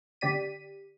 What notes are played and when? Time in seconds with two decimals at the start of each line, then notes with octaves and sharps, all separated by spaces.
0.21 D3 G4 D5 B6 D#7